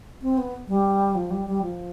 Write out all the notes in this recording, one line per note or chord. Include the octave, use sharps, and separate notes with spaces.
C4
B3
G3
F3
G3
G3
F3